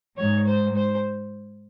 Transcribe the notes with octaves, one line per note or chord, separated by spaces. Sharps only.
G#2 C#5
C5
C5